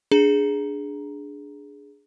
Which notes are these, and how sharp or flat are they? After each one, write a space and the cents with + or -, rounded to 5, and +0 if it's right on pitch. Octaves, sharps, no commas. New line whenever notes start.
D4 -5 G#4 +0 A#5 +5